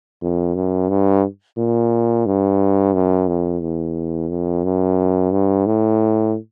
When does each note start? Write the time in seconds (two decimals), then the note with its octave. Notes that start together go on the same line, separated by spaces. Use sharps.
0.21 F2
0.55 F#2
0.89 G2
1.57 A#2
2.26 G2
2.93 F#2
3.27 F2
3.61 E2
4.29 F2
4.64 F#2
5.31 G2
5.66 A2